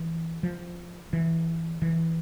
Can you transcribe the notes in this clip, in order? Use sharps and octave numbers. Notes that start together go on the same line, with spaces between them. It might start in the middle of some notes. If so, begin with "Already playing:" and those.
Already playing: E3
F3
E3
E3